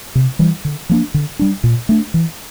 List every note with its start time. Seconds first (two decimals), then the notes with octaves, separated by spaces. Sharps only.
0.15 C3
0.39 E3 G3
0.65 D3
0.89 F3 A#3 D4
1.14 D3
1.39 G3 D4
1.64 A#2
1.89 A3 D4
2.14 E3